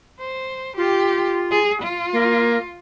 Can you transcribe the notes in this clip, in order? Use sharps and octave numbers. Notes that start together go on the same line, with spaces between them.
C5
F4 G4
G#4
F4
A#3